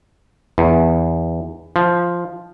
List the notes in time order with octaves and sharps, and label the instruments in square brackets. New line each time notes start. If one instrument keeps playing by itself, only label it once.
[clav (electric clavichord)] E2
F3